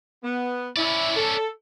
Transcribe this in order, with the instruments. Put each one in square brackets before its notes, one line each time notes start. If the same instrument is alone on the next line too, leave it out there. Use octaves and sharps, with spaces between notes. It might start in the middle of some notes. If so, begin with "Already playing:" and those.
[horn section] B3
[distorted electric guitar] C#4 D5 [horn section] E4
[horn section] A4